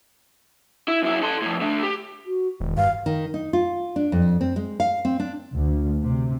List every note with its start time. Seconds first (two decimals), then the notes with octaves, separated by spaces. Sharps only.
0.88 E4
1.03 F#2 E4
1.23 A4 C6
1.42 A2 F3
1.61 D3 A3
1.83 G4
2.26 F#4
2.60 E1 D#3
2.77 G2 F5
3.06 D#3
3.34 D#4
3.53 F4
3.96 D4
4.12 F2
4.41 C4
4.56 G#3
4.80 F5
5.05 C4
5.20 D4
5.54 D2
6.04 C3